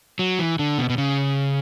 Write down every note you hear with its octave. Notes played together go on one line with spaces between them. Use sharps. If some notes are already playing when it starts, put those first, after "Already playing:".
F#3
E3
D3
B2
B2
C#3